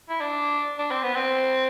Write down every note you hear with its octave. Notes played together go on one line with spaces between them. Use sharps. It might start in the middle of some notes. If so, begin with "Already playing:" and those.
E4
D4
D4
C4
B3
C4